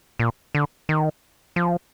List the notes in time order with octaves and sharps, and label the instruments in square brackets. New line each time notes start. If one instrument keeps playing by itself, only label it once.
[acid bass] A#2
D3
D#3
F3